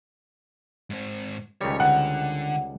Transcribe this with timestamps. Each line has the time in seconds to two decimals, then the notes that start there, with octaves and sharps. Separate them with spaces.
0.90 G#2 C4
1.61 C#2 D#3 G3 C#5
1.80 D3 F#5